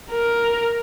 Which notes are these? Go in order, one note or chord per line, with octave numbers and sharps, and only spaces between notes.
A#4